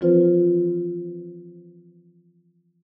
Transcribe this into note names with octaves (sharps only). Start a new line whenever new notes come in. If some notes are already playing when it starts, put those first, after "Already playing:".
E3 F3 C4 F4 B4 C5